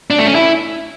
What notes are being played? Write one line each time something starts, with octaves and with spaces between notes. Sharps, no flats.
D4
A3
C#4
E4